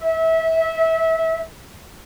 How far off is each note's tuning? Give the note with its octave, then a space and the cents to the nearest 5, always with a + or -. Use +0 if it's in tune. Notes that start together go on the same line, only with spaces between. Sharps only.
E5 -25